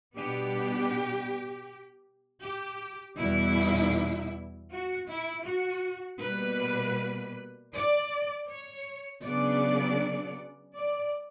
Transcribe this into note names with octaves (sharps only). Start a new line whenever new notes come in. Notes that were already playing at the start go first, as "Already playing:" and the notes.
B2 G3 B3 D4 G4
G4
E2 B2 G3 E4
F#4
E4
F#4
B2 G3 A#3 B4
D5
C#5
C#3 F#3 B3 D4 D5
D5